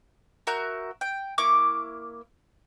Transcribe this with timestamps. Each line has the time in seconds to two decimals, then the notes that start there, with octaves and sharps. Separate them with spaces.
0.47 F#4 A#4 E5 G6
1.01 G5
1.38 A#3 E4 C#6 D6